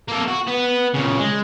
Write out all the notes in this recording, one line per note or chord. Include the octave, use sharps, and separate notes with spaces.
A#3 A4
F#4
B3 B4
A#2 C#3
G#3